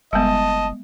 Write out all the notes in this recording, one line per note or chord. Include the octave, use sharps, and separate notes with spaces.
F#1 G3 G#3 B3 D#5 A5